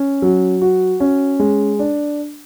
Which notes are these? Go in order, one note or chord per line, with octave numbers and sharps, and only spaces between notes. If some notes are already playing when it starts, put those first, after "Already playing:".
Already playing: C#4
F#3
F#4
C#4
G#3
D4